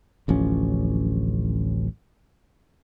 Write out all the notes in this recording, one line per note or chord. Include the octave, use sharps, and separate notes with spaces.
D1 A1 F3 C#4